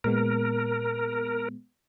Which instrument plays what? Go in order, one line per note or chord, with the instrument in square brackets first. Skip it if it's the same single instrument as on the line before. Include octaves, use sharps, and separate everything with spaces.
[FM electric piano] A#2 G#3 B3 [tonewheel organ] A#4